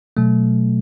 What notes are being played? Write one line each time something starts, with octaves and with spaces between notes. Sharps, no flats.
B2 F#3 A3